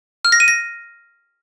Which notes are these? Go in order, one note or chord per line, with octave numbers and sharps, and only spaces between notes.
F6
A#6
D#7
A#6